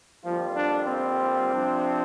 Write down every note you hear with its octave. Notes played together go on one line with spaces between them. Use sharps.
F2 D3 F3 G3 A#3 F4
D4
C4
C3 F3 D4